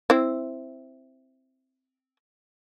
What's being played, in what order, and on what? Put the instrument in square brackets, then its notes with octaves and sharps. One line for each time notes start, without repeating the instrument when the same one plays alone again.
[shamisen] C4 E4